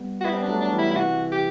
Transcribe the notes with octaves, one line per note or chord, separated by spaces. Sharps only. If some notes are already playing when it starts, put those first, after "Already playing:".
Already playing: G3 B3
F#4
G3 B3 E4
C4
D4
F#3 A3
D4
E3 G3
E4
E4
C3 E3 F#4
G4